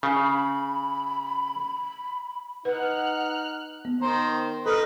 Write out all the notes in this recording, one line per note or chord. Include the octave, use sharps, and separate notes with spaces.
C#3 B5
D#4 B4 F#5 F6 F#6
B3
D#3 C5 A#5
D#4 A4 B4 F6